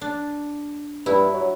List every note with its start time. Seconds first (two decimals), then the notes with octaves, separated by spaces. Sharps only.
0.01 D4
1.06 G2 E4
1.34 F#3